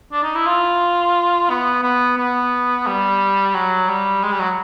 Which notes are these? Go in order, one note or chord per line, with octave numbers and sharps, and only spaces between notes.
D4
D#4
E4
F4
B3
B3
B3
G3
F#3
G3
G#3
G3
F#3